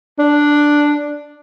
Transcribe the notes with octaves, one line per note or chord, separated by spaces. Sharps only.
D4